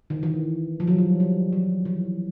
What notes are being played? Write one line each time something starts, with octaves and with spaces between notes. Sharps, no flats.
D#3
E3
F3
F#3
G3
G3
F#3
E3